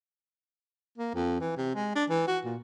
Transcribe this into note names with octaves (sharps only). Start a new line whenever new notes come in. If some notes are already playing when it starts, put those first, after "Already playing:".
A#3
F2
E3
C3
G#3
D4
E3
F#4
A#2